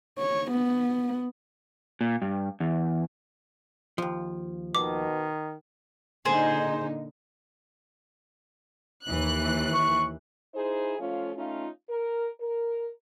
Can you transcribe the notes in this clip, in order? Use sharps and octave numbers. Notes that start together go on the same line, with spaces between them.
C#5
B3
A#2
G2
E2
D#2 F3
B2 D#3 D6
A#2 D3 D#4 G#4 C5
D#2 E3 F#6
C#6
D#4 E4 G#4 C5
F3 A3 C#4 F4
A3 C#4 D#4 F4
A#4
A#4